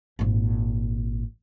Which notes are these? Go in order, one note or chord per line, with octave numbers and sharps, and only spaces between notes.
G#1 A#2